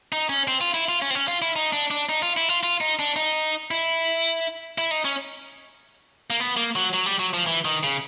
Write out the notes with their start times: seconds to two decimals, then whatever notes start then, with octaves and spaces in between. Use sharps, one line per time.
0.12 D#4
0.29 C#4
0.48 C4
0.61 F4
0.74 E4
0.89 F4
1.02 C#4
1.10 C4
1.15 C#4
1.28 F4
1.42 E4
1.56 D#4
1.73 D4
1.91 D4
2.09 D#4
2.23 F4
2.37 E4
2.49 F4
2.63 F4
2.81 D#4
2.99 D4
3.16 D#4
3.71 E4
4.78 E4
4.91 D#4
5.05 C#4
6.30 A#3
6.40 B3
6.57 A#3
6.76 F#3
6.94 F#3
7.06 G3
7.19 F#3
7.33 F3
7.47 E3
7.65 D#3
7.83 C#3